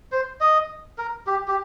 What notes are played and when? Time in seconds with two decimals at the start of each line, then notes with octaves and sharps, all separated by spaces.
0.12 C5
0.41 D#5
0.98 A#4
1.27 G4
1.48 G4